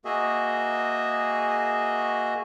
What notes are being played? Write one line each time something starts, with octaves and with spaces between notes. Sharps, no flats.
A#3 F#4 G#4 D#5 E5